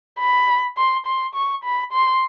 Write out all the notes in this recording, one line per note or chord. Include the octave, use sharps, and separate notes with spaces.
B5
C6
C6
C#6
B5
C6